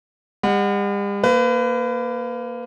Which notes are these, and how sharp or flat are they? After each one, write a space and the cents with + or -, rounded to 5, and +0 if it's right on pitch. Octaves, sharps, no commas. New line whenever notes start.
G3 +45 F#5 +0
A#3 +0 B4 +30